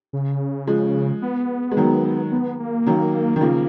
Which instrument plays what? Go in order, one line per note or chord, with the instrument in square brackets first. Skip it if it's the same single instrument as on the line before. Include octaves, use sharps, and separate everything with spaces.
[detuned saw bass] C#3
[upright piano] F3 G#3
[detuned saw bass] B3
[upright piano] G#3
D#3 F#3
[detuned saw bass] B3
A#3
[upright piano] D#3 F#3
D#3
[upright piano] C#3 F3 [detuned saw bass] A#3